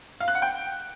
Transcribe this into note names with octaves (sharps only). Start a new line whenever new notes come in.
F5
F#6
F#5
G5